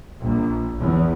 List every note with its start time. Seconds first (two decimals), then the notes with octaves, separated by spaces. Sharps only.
0.22 A#1
0.79 E2